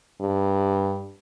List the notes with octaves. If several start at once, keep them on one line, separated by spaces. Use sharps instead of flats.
G2